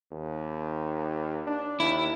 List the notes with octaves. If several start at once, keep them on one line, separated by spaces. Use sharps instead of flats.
D#2
D4
D#2 E4